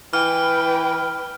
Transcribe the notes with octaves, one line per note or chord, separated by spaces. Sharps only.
E3 B4 G5 F6